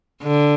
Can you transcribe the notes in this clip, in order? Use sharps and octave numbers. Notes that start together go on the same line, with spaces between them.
D3